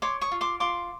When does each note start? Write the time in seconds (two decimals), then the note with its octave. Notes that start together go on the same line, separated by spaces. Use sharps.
0.02 C#5 C6 D6
0.21 C#6 D#6
0.32 F4
0.41 C6 D6
0.60 F4 C6 D6